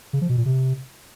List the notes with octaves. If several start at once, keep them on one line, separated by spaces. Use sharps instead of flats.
C#3
F3
B2
A#2
C3